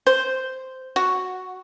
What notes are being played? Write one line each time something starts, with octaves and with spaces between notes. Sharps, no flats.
C5
F#4